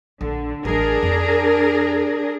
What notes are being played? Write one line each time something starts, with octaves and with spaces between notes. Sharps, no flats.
A#1 D3
A1 G#3 D4 G#4 A#4
F2